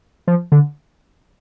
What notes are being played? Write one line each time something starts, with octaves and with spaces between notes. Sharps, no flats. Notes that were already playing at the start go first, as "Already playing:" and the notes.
F3
D3